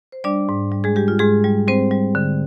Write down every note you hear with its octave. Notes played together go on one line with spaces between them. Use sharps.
C5
G3 D4 D5
G#2
G3
G#3 G#4
G3 G4
F4
G#2 G#3 G#4
G3
G3 C4 C5
G3
D3